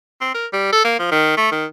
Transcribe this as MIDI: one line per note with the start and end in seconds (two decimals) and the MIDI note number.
0.21 0.32 60
0.34 0.46 70
0.53 0.69 55
0.72 0.82 69
0.85 0.98 58
0.99 1.09 53
1.11 1.34 51
1.37 1.51 57
1.51 1.65 51